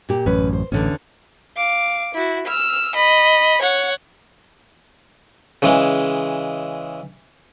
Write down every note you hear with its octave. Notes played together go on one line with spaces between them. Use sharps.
A#2 G4
A1 F#2 C#4 B4
C5
A1 E2 D3 C#4
F5 D6
E4 F#4
E6 F6
D#5 B5
C#5 F#5
C#3 E3 G#3